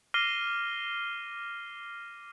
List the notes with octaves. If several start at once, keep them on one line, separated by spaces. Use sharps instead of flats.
D6 F6 A#6 C7 D#7 G7